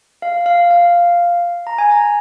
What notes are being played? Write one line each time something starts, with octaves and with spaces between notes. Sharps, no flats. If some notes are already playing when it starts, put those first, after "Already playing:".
F5
F5
F5
A#5
G#5
A#5